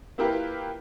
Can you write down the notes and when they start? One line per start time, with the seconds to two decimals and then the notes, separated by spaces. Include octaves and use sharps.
0.18 A#3 E4 F4 G4 A#4 B4